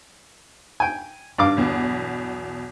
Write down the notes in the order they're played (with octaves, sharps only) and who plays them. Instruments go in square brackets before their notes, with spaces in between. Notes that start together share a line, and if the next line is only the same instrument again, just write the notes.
[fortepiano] G5 G#5
G2 F5 D6
[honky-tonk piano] B1 E2 B2